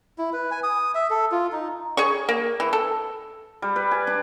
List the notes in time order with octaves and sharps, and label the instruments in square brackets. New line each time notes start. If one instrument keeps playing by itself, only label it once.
[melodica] E4
B4
G#5
D#6
E5
A4
F4
D#4
[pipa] G#4 C#5 C#6
A#3
E3
A4
[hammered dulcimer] G3
B4
G#5
D4